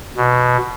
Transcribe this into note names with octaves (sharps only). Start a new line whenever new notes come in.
B2